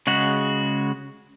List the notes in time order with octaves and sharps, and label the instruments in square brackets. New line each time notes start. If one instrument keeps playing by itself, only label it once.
[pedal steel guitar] C#3 G#3 F#4